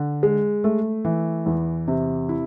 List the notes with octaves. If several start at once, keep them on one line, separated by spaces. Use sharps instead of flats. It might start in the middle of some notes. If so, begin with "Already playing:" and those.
Already playing: D3
G#3
A3
E3
E2
C3
E4